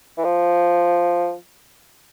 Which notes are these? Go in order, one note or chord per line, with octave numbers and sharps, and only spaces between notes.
E3
F3